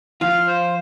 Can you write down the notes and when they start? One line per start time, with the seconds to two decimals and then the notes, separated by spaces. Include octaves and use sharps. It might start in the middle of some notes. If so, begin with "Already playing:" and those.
0.21 F3 F4 F5
0.47 C5